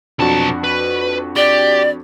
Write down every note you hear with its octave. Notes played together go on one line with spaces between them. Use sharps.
B1 F2 D4 F#4 A5
B4
G4 D5